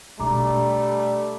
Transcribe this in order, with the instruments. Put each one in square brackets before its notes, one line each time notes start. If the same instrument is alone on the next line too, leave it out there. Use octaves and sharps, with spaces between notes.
[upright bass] B2 D4 [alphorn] G3 [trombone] A3 [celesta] A#5 D6